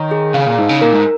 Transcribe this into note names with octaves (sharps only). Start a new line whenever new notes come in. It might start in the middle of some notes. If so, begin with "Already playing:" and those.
Already playing: D#3 C#5
G#4
C#3 F5
A#2
G#2 D#4
C#3
A#2 A#4
G#2